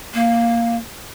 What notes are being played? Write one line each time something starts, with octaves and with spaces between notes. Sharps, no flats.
A#3